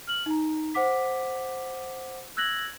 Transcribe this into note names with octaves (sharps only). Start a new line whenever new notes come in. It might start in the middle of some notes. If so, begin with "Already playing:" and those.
F6 F#7
D#4 A#5
C5 F#5 D6 B6
E6 F#6 G#6 A#6 F#7